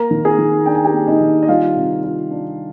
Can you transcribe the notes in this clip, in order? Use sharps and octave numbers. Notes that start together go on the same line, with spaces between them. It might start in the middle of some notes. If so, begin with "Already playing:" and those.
Already playing: A#3 A#4 A#5
D#3
G#4 G#5
D#3
D4 G5
G#5
G4 G5
A#3
D#4 D#5
D#3
D#5
G3 F4 F5
C3
F4
D4